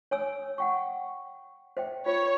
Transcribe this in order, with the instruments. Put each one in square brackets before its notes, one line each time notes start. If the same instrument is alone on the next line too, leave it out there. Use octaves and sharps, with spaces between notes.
[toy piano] C#5 G#5 E6
F#5 G5 C#6
C5 E5 G5
[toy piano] F4 [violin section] C#5